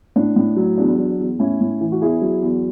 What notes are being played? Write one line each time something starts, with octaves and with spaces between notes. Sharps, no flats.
A2 D4
A2
F#3
E2 D4
F#3
E2
A2 C#4 E4
A2
E3
F#4
E2 E4 G#4
F#3
E2